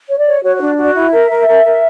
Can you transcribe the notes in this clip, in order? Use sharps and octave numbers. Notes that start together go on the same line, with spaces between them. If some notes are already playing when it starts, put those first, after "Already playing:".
C#5
D5
C#5
F#4 C#5
C#5
D4
F#4 D5
E4 E5
A#4
A#4
A#4
A#4